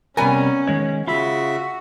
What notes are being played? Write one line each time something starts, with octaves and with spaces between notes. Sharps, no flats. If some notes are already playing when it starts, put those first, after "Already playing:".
C3 G3 B3 C#4 A#4 G#5
D#3 G#3 C#5
C#3 F4 F#4 E5 B5